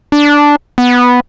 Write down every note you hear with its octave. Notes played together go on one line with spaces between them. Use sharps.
D4
B3